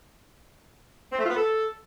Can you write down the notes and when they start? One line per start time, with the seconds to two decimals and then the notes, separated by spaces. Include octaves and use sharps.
1.12 C4
1.18 A3
1.24 F4
1.30 B3
1.35 A4